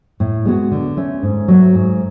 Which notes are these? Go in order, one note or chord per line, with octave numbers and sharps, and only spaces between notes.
A2
G#3 B3 F#4
D3
A3 C#4
G#2
F#3 A3
G#2